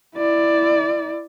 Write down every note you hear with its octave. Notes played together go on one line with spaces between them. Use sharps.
E4 D5